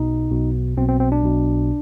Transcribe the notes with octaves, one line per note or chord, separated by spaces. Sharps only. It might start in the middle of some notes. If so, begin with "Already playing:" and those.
Already playing: B1 B2 D#4
B1 B2
B1 B2 C4
C4
C4
D4
B1 B2